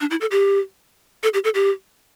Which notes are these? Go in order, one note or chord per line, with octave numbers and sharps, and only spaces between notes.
D4
E4
A4
G4
A4
G4
A4
G4